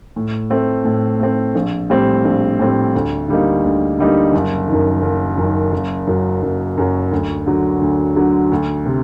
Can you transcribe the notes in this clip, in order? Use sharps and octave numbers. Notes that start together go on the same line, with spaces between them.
A2
A3 C4
A2
A3 C4
A#1
A2 G3 C4
A#1
A2 G3 C4
D2
D3 G3 A#3 D#4
D2
D3 G3 A#3 D#4
F#1
F#2 D#3
F#1
F#2 D#3
F#1
F#2 F#3
F#1
F#2 F#3
D2
D3 F#3
D2
D3 F#3
D2
C3